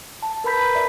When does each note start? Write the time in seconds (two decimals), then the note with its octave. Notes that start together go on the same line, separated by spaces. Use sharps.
0.22 A5
0.44 A#4 B4 A#5 B5 G6 B6
0.75 D5 E5